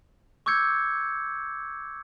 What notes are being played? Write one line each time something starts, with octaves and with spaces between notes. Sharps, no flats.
C#6 D6 E6 G6 G#6 C#7